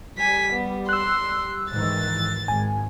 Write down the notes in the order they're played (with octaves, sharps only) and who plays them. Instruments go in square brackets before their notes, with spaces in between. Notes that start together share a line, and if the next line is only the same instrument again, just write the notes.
[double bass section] G3 [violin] G#5 B6
[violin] B3
[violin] C6 [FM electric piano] E6 F#6
[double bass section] G#2 D#3 E3 [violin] A6
[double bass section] G#1 [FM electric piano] G#5